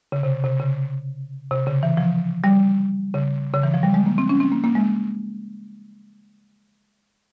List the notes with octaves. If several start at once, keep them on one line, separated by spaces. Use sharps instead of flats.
C#3
C3
C3
C#3
C3
C#3
E3
F3
G3
C#3
C#3
E3
F3
G3
G#3
A#3
C4
C#4
C4
A#3
A#3
G#3